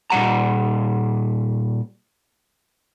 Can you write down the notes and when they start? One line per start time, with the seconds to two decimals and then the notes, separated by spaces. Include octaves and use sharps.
0.10 A#2 G3 F#5 A#5